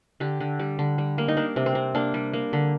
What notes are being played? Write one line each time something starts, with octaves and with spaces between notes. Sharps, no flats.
D3 G4
D3
G3
D3
G3
A#3
D#4
A#3 D4
C3
C4
C3
A#3 D4
G3
A#3
D3